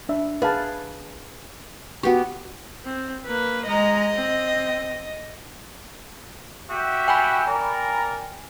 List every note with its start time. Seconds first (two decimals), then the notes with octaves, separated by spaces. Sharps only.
0.09 D4 E5
0.42 G#4 B4 F5 A5
2.03 B3 F#4 G4 C#6
2.84 C4
3.27 A#3 B4
3.67 G#3 D#5 A#5
4.13 C4
6.70 F#4 G4 E5
7.08 G5 G#5 B5
7.47 A#4 D5 A#5